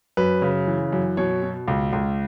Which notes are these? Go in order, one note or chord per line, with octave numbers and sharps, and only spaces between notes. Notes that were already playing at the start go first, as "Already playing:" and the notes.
F#2 B4
C#3
E3
F#2
B2 C#5
B2
C#2
C#2